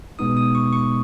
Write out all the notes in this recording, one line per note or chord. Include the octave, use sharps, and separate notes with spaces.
B2 G#3 B3 D#4 D#6
D#6
C#6
C#6